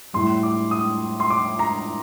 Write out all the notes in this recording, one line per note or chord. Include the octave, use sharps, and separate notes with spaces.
A2 G3 C6
D6
D#6
C6
D6
A#5